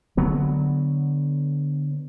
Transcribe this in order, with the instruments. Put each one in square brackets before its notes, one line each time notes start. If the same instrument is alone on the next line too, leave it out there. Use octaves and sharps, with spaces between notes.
[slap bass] D3 F#3 B3